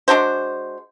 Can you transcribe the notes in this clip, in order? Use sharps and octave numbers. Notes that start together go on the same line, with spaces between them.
G#3 D4 F#4 C5